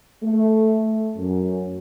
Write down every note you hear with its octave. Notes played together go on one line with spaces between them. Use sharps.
A3
F#2